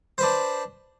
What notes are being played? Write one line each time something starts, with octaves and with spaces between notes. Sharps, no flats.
D4 B4 C5